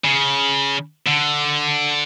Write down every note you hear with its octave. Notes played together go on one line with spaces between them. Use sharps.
C#3
D3